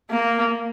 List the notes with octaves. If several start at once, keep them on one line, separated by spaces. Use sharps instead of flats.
A#3